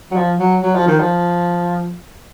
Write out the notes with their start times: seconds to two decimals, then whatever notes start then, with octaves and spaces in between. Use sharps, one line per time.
0.11 F#3
0.16 F3
0.39 F#3
0.63 F#3
0.75 F3
0.87 D#3
1.00 F3